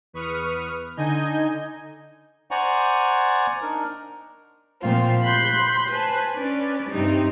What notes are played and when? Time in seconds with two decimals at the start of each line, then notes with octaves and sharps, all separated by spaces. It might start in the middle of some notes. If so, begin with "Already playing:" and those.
0.13 E2 B4 C#6 D#6 F6
0.97 D3 D#4 D#5 G#5 G6
2.51 C5 D5 F#5 G#5 A#5 C#6
3.62 D4 D#4 A#4
4.81 A#2 F3 A3 C4 F4
5.23 B5 C6 F#6 G6
5.89 B4 C5 G#5 A5
6.35 C#4 D4 B4 D5
6.89 G2 C3 C4 D#4